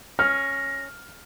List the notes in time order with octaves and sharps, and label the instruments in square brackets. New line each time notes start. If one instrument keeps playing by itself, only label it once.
[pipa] C#4 [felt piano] F6 [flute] A#6